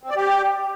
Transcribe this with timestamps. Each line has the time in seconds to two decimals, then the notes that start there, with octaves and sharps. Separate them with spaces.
0.03 C4
0.10 D5
0.16 G4